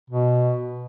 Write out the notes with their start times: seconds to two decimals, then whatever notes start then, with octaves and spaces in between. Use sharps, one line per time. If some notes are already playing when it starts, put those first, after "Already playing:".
0.10 B2